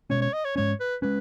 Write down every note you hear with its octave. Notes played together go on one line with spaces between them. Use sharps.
B2 G#3 C#4 C#5
C#5
D#5
C#5
G#2 G#3 C#4 C#5
B4
G#3 C#4 B4